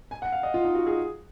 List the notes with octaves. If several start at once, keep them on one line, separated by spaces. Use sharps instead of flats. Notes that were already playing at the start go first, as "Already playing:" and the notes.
G#5
F#5
F5
D#5
F4
D#4
F#4
G#4